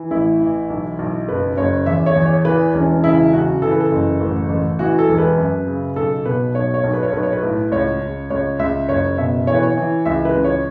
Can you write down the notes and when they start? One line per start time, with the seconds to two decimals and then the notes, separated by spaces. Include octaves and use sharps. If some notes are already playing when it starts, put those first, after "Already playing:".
Already playing: E3
0.11 A1 E4
0.40 E3
0.70 B1
0.99 B1
1.28 F#1 B4
1.57 F#1 C#5
1.86 E2 E5
2.06 C#5
2.16 E2
2.26 C#5
2.45 E3 B4
2.74 E1 C#4
3.03 C#3 E4
3.33 C#3 F#4
3.62 E3 A4
3.71 B4
3.80 A4
3.91 F#1
4.21 A1
4.49 A1
4.79 E3 F#4
4.99 A4
5.09 E1
5.18 B4
5.38 F#2
5.67 C#3
5.96 B1 A4
6.26 B2 B4
6.55 B1 C#5
6.74 C#5
6.84 B1
6.93 B4
7.03 C#5
7.13 B1 B4
7.23 C#5
7.33 B4
7.42 A2
7.72 C#2 C#5
8.01 C#2
8.30 C#2 C#5
8.59 C#2 E5
8.89 F#1 C#5
9.18 B2 E5
9.47 E3 C#5
9.55 B4
9.63 C#5
9.77 E3
10.05 C#2 E5
10.25 B4
10.35 C#2
10.45 C#5